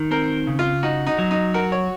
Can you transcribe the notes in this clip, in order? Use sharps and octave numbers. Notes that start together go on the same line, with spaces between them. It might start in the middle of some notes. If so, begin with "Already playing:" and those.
Already playing: D#3
C4 A#4
C#3
F4
D#4 F#4
D#4
F#3
D#4
F#4 A#4
C#5